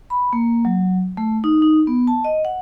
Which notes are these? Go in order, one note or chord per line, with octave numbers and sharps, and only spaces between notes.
B5
A#3
F#3
A3
D#4
D#4
B3
A5
D#5
F#5